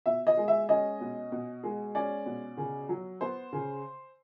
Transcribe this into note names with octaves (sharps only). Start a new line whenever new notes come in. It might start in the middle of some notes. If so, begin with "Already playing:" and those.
B2 E5
D#5
G#3
E5
C#4 D#5
B2
B2
G#3
C#4 D5
B2
C#3
F#3
B3 C5
C#3